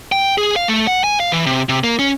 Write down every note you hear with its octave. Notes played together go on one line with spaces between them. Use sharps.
G5
G#4
F5
A3
F#5
G#5
F5
E3
C3
C3
A#3
C#4